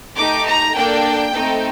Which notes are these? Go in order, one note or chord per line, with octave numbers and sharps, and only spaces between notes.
A3 D#4 G4 D6
A#5
A#3 D4 A4 G5
A3 C4 D#4 A4